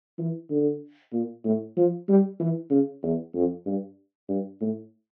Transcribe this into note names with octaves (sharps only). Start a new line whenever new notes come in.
E3
D3
A#2
A2
F3
G3
E3
C#3
E2
F2
G2
G2
A2